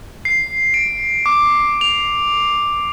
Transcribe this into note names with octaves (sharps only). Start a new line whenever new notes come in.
C7
D7
D6
F7